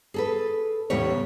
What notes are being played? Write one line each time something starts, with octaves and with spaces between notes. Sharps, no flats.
G#4 A4 B4
E2 A2 C#3 G3 C#5